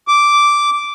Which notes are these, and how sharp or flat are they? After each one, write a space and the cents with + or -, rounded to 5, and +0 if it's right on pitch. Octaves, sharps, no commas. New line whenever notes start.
D6 -5